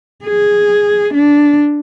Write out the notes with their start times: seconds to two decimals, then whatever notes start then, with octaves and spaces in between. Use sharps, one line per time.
0.25 G#4
1.14 D4